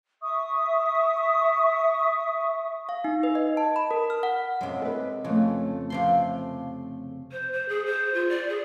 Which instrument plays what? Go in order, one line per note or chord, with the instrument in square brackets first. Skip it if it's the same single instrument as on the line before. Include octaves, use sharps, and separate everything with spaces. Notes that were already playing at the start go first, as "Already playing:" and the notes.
[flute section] E5 C#6 D#6
[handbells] F5
D#4
B4
D#5
A5
B5
A#4
F6
F#5
[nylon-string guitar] F#2 [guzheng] C3 G#3
[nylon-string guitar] A4 B4
[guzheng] F2 [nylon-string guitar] C#3 A3
[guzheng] C3 F3 C6
[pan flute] C5
C5
G#4
C5
F4
D5
G#4